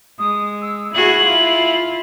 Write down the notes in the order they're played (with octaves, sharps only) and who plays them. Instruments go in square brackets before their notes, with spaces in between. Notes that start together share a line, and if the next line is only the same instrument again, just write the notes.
[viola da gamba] G#3 [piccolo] D#6
[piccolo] E6
[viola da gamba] E4 F#4 G#4 [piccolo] F#7
[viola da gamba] E4 F4